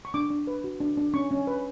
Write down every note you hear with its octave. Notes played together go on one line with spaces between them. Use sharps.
C#6
D4 D6
D4
B4
F#4
D4
D4
C#4 C#6
C#4
B4